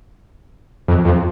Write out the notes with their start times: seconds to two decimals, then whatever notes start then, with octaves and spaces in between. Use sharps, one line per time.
0.88 F2
1.05 F2